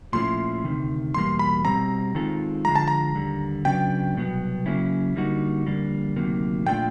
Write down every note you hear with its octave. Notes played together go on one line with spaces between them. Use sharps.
A#2 F3 A3 C#4 E4 C6
D2 C3 D#3
E2 B2 G3 A#3 C6
B5
B2 G3 C4 A#5
D#3 G#3 C4 F4 A4
D3 F3 G#3 A#5
A5
A#5
D#2 D3 G3
C#3 F#3 B3 D4 G5
C2 B2 F#3 B3
C#3 F#3 A#3 C#4 E4
D3 G3 A#3 D#4 F#4
F2 D3 G3 A#3 D4
D2 C3 D#3 F#3 A#3
A#2 F3 A3 D4 F4 G5